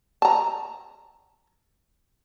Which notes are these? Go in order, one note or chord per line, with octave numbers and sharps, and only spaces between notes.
A5 A#5